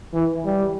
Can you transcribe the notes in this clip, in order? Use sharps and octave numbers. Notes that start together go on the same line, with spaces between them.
E3
G3